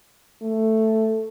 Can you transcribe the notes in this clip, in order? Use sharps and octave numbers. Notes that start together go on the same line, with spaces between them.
A3